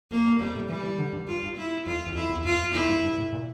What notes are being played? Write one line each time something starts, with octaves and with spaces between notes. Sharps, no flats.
F2 A#3
G2
F2 G3
A2
E3 G3
E3
D3
G2
G2 F4
G2
E4
F2 F4
E2
F2 E4
E2
F2 F4
F2 E4
G2
G2
A2
A#2